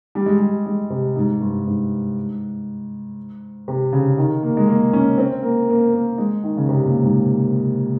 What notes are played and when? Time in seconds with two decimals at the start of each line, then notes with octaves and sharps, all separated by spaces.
0.15 G3
0.26 G#3
0.39 G3
0.66 G#3
0.90 C3
1.16 G#2
1.41 G2
1.66 G#2
3.68 C3
3.93 C#3
4.18 D#3
4.43 A#3
4.57 G#3
4.68 A#3
4.93 C#4
5.18 C4
5.43 A#3
5.69 A#3
5.93 A#3
6.18 G#3
6.44 D#3
6.57 C#3
6.69 C3
6.86 A#2
7.03 G#2